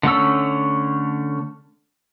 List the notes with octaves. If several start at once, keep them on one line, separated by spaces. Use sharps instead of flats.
D3 A3 C#4 E6